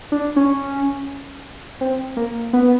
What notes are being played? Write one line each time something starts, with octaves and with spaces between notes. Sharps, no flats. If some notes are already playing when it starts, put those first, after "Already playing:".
D4
C#4
C4
A#3
B3